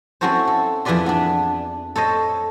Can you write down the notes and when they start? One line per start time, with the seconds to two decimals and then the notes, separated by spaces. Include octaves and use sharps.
0.21 C4 C#4 E4 F#4 A4 C5
0.47 A4
0.85 F2 E3 G#4 B4 D5 C6
1.06 B3 D4
1.96 A4 C5 C#5 D#5